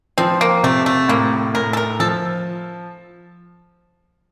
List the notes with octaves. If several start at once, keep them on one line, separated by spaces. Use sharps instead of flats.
F3 C4
A#3
C3 A3
A3
A2 A#3
A2 A#4
A4
A#4
F3 A4